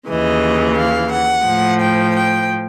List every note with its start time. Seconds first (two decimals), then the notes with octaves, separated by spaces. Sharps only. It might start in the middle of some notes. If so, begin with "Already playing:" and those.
0.10 D#2 C#3 E3 D#5
0.77 F5
1.12 F#5
1.46 A2 F3
1.80 G5
2.15 G5